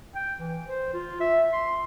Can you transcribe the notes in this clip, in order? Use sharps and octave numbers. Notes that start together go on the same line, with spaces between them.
G5
E3
C5
F4
E5
C6